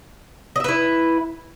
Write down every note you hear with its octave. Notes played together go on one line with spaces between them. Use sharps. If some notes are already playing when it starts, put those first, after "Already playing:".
E4 B4 D#5 E5